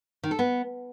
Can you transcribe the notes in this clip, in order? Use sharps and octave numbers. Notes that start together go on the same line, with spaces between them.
D#3
A4
B3